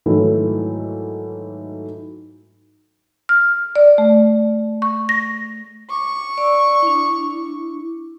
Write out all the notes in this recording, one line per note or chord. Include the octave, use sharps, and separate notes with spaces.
G#2 D#3 E3 F#3 A3
F6
D5
A3
C#6
A#6
C#6 D6
D5 E6
D4 E4